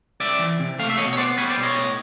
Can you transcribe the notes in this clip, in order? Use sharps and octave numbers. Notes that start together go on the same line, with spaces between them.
C2 D5 E5
E3
C3
A3 F5
E5
B2 C#5 D#5
C#5
B3 C5 D5
G3 B4 C#5
C5 D5
B2
C#5 D#5
A2